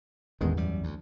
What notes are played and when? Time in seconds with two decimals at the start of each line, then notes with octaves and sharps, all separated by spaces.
0.41 A1 E2 D#3 G#3
0.57 F#2 G3
0.84 D2